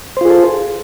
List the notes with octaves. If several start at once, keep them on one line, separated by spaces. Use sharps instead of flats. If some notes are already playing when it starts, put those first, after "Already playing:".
F4 G#4 A4 C5